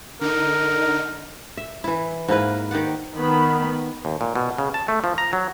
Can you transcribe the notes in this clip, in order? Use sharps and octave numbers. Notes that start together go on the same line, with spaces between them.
D3 D#4 A#4
E5
E3 E4
G#2 A#3 E4 B4
D#3 G4 D5 F#5
D#3 B3 B5
D#2
A#2
B2
C#3
A5
A3
F3
A#5
F#3